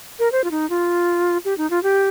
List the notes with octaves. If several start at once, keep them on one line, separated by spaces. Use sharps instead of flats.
A#4
C5
F4
D#4
F4
G4
D#4
F4
G4